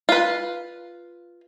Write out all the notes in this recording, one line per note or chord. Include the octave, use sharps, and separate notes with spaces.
F4 B4